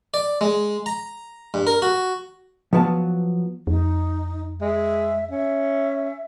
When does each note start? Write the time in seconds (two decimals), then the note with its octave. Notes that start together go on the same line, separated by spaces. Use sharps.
0.14 D5
0.41 G#3
0.86 A#5
1.54 G2
1.67 A#4
1.82 F#4
2.73 F3 F#3 B3 A5
3.67 F2 D#4
4.61 G#3 E5
5.31 C#4 E5